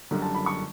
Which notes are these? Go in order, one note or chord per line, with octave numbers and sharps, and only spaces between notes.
F#1 F#2 D3 G3
A5
B5
C#6